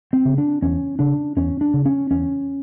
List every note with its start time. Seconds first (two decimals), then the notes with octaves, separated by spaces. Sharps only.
0.13 C4
0.25 C#3
0.38 D4
0.62 E2 C#4
0.99 C#3 D4
1.36 E2 C#4
1.61 D4
1.74 C#3
1.86 C#4
2.11 E2 C#4